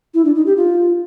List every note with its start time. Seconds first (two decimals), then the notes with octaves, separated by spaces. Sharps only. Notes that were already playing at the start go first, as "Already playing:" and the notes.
0.14 E4
0.25 D4
0.35 D#4
0.46 G4
0.57 F4